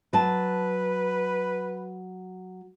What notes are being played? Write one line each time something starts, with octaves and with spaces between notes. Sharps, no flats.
F#3 B4 A5